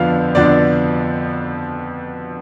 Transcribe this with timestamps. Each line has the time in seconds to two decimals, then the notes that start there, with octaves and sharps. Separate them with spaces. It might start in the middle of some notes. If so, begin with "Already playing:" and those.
Already playing: F2 D3 F3 B3 D4 F5
0.35 F2 D3 F3 B3 D4 D5